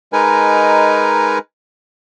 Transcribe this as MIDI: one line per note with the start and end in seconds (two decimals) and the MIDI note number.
0.13 1.38 56
0.13 1.38 63
0.13 1.38 70
0.13 1.38 71
0.13 1.38 80